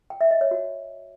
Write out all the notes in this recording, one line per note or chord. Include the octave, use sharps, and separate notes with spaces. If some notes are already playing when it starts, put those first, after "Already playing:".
G5
E5
D#5
C#5
F#4